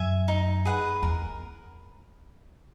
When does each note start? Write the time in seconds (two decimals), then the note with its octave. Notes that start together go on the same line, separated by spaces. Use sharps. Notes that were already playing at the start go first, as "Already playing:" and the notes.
Already playing: F#2 E5 G#5
0.28 D#4
0.65 G#4 B4 F#5
1.02 E2 A#4